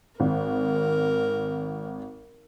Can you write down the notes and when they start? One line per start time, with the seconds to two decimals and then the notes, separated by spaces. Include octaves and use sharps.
0.20 G#1 A#4